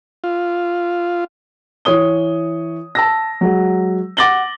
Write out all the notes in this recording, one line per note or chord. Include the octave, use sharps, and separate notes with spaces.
F4
E3 C#5 D#6 G7
A5 E6 A#6
F#3 G#3 F#4
F#5 D6 A6 A#6 F#7 G7